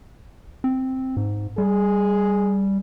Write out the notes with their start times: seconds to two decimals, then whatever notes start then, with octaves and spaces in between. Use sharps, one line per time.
0.64 C4
1.17 G#2
1.58 G3 G#4